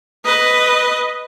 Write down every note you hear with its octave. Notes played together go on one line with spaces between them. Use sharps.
B4 D#5